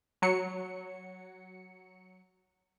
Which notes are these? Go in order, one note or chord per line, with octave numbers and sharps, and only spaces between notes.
F#3 C#7